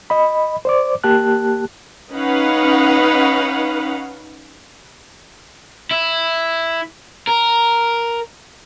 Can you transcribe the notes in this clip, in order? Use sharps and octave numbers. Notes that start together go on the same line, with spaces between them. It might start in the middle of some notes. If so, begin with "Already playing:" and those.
D#5 B5
C5 D5 D6
A#3 G4 A5 F#6
C#4 D#4 B4 F5 F#5
E4
A#4